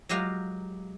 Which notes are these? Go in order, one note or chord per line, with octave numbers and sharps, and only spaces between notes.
F#3 G#3 F4 G4 A#4 F5